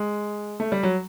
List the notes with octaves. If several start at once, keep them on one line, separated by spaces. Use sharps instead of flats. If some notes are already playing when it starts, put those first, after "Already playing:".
Already playing: G#3
A3
G3
F#3